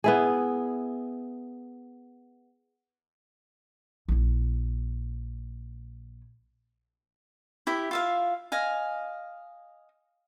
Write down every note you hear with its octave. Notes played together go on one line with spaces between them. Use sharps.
B3 E4 G#4
A#1 E4
E4 G4 E5
F4 E5 F5
D#5 F5 G#5